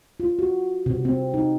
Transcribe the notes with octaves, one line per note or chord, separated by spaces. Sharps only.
F4
F#4
C3
C4
D#4